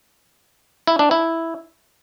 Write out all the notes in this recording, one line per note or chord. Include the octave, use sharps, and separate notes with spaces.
E4
D4
E4